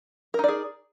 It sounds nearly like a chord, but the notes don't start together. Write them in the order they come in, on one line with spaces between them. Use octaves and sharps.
A#4 D#4 D5 G#4